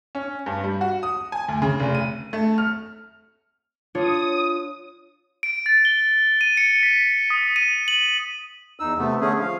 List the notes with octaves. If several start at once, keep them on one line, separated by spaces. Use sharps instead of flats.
C#4
G2
G3
F#4
D#6
G#5
D2
C#3
F1
D#7
A3
F6
D4 F4 C#5 D#6
D7
A6
G7
D#7
C#7
B6
D#6
D#7
F#7
E2 D#4 E6
C3 A3 B3
D3 A3 C#4 G#4
F3 F5